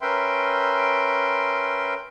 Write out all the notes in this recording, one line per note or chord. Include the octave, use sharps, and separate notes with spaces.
C#4 A#4 B4 E5 G5 C6